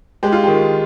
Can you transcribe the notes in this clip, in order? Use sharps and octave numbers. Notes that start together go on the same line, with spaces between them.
G#3 G4
F4
D#3 G4